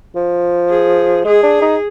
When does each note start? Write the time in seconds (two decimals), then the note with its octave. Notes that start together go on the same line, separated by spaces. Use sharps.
0.16 F3
0.70 G#4
1.25 G#3 G#4
1.43 D4
1.62 D#4